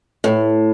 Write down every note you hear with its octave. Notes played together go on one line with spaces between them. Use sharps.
A2